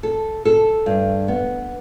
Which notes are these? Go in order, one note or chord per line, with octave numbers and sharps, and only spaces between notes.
A4
A4
G2
B3